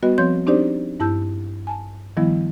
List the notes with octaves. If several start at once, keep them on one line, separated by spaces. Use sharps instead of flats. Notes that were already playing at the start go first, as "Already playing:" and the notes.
G3 B3 F#4 B4 D#5
F3 C4 C#5 C6 G6
C4 D4 D#4 G4 C5 D5
G2 E4 A5 E6 G6
G#5 A5
D#3 F3 G3 B3 E4